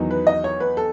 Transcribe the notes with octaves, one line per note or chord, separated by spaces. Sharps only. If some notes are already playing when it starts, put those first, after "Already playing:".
Already playing: E2 D#3 F#3 B3 D#4
B4
D#5
C#5
B4
A4